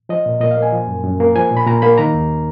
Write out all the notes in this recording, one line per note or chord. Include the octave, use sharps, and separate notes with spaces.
F3 D#5
A#2
A#2 D#5
F5
A#3
G#5
F3
F#2
F#2
A#3
F3 G#5
A#2
B5
A#2 A#5
A#3 B5
D#3 A#5
D#2